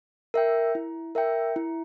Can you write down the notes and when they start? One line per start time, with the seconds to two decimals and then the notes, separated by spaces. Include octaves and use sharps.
0.34 A#4 E5 G5
0.75 E4
1.15 A#4 E5 G5
1.56 E4